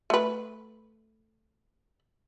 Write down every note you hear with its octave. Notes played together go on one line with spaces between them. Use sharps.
A3 B4